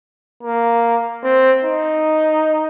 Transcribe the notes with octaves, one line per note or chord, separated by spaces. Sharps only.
A#3
C4
D#4